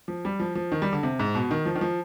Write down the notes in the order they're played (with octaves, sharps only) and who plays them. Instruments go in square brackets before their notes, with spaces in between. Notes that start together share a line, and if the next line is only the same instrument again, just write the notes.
[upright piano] F3
G3
F3
F3
D#3
G3
D3
C3
G#2
B2
D#3
F3
D#3
F3